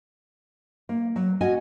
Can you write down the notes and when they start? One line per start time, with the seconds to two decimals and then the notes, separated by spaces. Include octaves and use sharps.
0.89 A#3
1.16 F#3
1.41 C#4 F#4 D#5 F#5 G#5